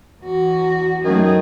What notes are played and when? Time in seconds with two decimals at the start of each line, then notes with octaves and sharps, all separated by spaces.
0.21 E2 F#4
1.04 F#2 D#3 A3 G#4